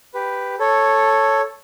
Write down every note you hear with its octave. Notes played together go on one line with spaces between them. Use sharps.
G4 B4
A4 C#5